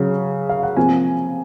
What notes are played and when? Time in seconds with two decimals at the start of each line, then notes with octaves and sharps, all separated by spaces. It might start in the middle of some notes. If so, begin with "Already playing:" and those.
Already playing: C#3 F#3 C#4
0.49 F5
0.63 F#5
0.77 C3 F3 A#3 G#5